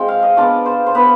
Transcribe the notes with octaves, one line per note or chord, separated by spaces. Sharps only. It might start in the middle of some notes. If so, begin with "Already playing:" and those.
Already playing: G#3 C4 F4 G5
F5
D#5
B3 D4 F4 D5
C5
C5
B3 F4 B4